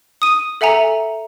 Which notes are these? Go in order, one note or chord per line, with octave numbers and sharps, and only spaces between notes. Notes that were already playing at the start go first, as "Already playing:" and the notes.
D#6 D#7
A4 E5 F#5 G#5 A#5